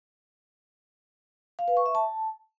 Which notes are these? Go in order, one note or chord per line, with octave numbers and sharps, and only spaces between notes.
F5
B4
C#6
E5
A5